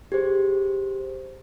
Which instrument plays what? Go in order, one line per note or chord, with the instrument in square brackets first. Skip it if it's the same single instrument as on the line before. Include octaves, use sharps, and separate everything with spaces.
[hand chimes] G4 G#4 C5